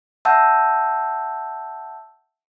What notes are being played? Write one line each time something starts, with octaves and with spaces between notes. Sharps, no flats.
E5 F#5 A5 E6 G6